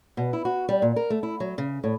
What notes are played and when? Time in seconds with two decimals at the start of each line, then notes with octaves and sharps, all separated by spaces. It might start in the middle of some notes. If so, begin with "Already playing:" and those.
0.17 B2
0.33 E4
0.45 F#4
0.69 G3
0.82 A#2
0.96 A#4
1.10 A3
1.23 E4
1.40 F#3
1.58 C#3
1.84 A2